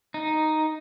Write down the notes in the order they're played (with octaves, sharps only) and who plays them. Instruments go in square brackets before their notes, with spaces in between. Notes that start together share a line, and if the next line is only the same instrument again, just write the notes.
[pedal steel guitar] D#4